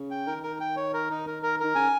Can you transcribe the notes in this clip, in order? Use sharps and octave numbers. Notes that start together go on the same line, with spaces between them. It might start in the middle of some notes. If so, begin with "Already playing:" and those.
Already playing: C#3
G5
D#3 A#4
A#4
G5
C#5
A#4
D#4
A#4
A#4
D#3 A#4
C#3 G#5